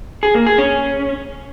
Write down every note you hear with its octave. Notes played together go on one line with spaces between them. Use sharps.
G#4
A#3
G#4
C#4